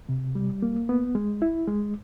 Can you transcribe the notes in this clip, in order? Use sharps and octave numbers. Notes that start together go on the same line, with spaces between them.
C3
G3
A#3
B3
G#3
E4
G#3